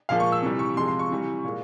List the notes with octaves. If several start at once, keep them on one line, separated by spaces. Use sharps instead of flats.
A#2 F3 G#3 F5
C#6
E6
C3 E3 G3
C#6
C3 F3 G#3 C6
C6
C#6
C3 E3 G3
A#2 G#3